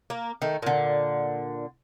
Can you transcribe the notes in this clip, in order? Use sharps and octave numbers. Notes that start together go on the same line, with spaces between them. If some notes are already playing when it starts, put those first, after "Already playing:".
A#3
D#3 A3
A#2 D3